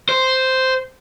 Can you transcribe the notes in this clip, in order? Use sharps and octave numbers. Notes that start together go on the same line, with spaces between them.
C5